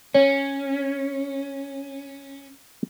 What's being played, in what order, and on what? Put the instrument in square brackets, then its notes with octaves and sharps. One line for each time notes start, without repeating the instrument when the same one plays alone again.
[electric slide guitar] C#4 [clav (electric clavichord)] C#5